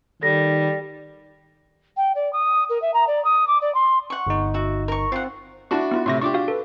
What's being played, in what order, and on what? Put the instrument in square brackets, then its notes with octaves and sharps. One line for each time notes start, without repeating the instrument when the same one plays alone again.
[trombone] D#3 [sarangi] G3 [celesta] A4 A#6
[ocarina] G5
D5
D#6
A#4
E5
A#5
D5
D#6
D6
D5
C6
[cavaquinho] F#5 C#6
[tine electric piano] G1 D#4
[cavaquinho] F#4 E5
A#4 C#6
[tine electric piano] C4 [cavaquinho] F4 F#5
[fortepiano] D4 F#4 [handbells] E4 A5 C#6 [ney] E5
[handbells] B3 E4 F4
[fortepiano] A2 C3 [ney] E5 [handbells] C6 C#6 A#6
[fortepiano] D4 G4 [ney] F4 [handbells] C#6 D6
[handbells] F#4 F5
[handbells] A4 [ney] B4